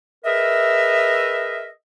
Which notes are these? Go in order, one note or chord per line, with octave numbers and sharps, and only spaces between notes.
G#4 A#4 B4 D#5 E5